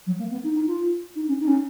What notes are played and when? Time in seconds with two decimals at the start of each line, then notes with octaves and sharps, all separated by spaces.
0.06 F#3
0.18 A#3
0.31 B3
0.43 D#4
0.55 D#4
0.67 F4
1.15 D#4
1.28 C#4
1.40 D#4
1.47 C#4